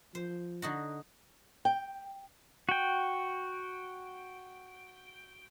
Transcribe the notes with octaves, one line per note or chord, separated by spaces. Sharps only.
F3 C5
D3 D#4 F#4
G5
F#4 G5